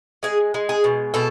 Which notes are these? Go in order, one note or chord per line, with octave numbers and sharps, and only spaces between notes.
G#3 G#4
G#3
G#4
B2
B2 A4